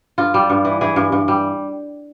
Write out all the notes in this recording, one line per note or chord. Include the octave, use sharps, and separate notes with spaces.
G2 F4
G3
G2
E3
E3 G#4
G2
G2
G3